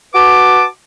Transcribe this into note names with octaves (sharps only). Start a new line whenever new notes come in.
F#4 B4 A5 D6